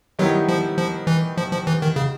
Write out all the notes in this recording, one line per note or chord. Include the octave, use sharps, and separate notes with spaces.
D#3 F#3 G3 B3 E4 G4
F3
F3
E3
F3
F3
E3
D#3
C#3